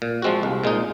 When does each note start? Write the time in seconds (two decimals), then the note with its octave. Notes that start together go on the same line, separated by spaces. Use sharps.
0.02 A#2
0.22 F3 G#3 C4 F#4
0.43 C2
0.64 A#2 G#3 D#4